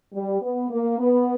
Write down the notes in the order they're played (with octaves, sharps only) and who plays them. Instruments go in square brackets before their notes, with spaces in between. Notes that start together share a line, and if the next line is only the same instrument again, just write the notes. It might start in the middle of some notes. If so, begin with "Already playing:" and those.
[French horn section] G3
B3
A#3
B3